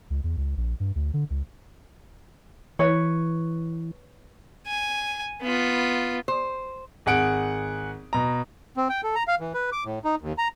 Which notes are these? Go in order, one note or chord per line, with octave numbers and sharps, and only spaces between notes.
C#2
E2
C#2
A#1
G2
D2
D3
C#2
E3 B4 C#5
G#5
B3 F4
C5
G#1 G#4 F#5 D7
B2 A#5
C4
G5
A4
A#5
F5
E3
B4
D6
A2
D#4
D#2
A#5